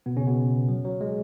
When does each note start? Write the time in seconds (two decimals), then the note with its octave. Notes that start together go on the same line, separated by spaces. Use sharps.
0.06 B2 B3
0.16 C#3 C#4
0.27 B2 B3
0.69 F#3
0.85 F#3
1.01 G#3